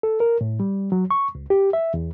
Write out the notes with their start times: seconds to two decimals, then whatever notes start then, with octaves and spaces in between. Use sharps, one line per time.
0.03 A4
0.20 A#4
0.41 A2
0.60 G3
0.92 F#3
1.11 C#6
1.35 C#2
1.50 G4
1.73 E5
1.94 E2